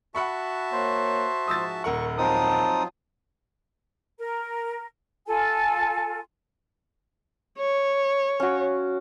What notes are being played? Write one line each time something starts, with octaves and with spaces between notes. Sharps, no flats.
F#4 E5 F#5 A5 B5 C#6
A#3 C5 C#5
G#2 F3 D#6 E6 A6
D#1 A#4 F#5 C#6
F3 F#3 C4 D#4 F4 A5 D#6
A#4
F4 A4 G#5
C#5
C#4 F#4